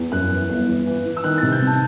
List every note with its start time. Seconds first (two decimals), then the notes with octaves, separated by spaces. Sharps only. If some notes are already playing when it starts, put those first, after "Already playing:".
Already playing: E2
0.12 F#2 F#6
0.31 E3
0.49 G1
0.68 E3
0.86 E3
1.06 E3
1.17 E6
1.24 D#3 F#6
1.38 C3 A6
1.52 G6
1.62 C3
1.67 A5